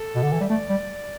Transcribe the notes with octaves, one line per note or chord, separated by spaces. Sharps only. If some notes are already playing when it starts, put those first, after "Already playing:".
Already playing: A4
B2
D3
E3
G3 E5
A3 D5
G3